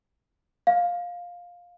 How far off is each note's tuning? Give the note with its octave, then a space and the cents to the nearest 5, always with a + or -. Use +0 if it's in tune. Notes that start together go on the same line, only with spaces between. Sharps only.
F5 +10